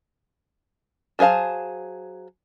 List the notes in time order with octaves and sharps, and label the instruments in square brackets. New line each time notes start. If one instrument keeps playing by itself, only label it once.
[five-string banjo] F#3 G#4 C5 F5 A5